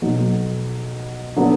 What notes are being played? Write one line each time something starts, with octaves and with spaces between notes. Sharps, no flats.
B1 B2 F#3
D3 F#3 B3 D4